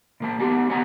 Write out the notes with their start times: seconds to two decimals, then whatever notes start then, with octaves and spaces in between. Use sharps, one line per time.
0.20 A#2 A#3 A5
0.40 B3 D#4 G4 A5
0.70 B3 C#5 D#5 F#5 G#5 A#5